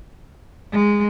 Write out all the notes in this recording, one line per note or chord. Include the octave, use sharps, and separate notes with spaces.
G#3